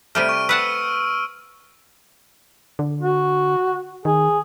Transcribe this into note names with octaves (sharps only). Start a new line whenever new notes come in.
C3 G3 A3 F6 D7 D#7
C#6
B4 F#5 A5 E6
D3
F#4
D#3 G#4